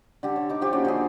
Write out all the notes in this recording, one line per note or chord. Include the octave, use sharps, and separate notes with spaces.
D3 G4 A4
C#5
D#4 D6
F3 G4 C#6
A#3 C#4 F#4
D3 F3 G#4